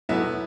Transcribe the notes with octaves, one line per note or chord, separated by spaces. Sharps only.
E2 B2 F#3 A3 B3 E4